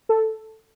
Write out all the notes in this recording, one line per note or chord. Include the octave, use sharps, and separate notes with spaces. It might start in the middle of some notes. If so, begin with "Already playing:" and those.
A4